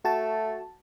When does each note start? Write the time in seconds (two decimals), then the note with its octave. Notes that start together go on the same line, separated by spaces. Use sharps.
0.05 A3 F#4 A5